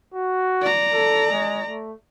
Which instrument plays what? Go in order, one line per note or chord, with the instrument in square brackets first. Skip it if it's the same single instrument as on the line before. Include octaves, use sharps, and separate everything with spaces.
[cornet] F#4
[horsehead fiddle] D5 A#5
[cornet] A4
G#3
A3